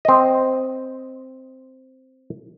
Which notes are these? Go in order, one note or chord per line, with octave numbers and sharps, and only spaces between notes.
C4 D#5